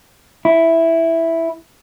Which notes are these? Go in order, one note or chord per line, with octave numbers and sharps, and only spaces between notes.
E4